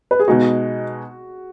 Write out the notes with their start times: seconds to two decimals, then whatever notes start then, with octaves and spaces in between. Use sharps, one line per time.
0.11 B4
0.19 G#4
0.28 B2 G#3 D#4 F#4